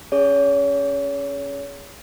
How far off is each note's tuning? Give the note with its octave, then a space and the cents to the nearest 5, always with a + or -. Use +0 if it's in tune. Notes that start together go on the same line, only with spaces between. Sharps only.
C#4 +0 G#4 +0 C#5 +35